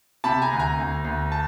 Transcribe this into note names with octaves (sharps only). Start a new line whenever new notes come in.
C3 A5 B5
G#5 A#5
D2
G#5 A#5
D2
D2
A5